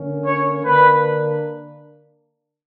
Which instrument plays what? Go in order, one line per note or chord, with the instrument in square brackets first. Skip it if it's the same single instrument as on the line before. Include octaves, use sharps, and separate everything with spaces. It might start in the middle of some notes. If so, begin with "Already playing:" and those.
Already playing: [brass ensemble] D3 A#3 C#4
C#5
D3 A#3 D4 B4